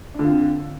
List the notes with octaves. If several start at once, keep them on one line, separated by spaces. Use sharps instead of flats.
D3 C4 D4 F4